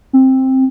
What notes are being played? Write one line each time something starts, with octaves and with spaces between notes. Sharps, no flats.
C4